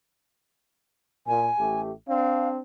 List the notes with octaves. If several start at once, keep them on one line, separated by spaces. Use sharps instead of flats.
A#2 G#5
A1 A3 G4
C4 D4 F5